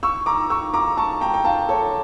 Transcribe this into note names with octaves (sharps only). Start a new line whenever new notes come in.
C#6 E6
A#5 D6
C#6 E6
A#5 D6
A5 C#6
G5 A#5
G5
F5 A5
A4 C#5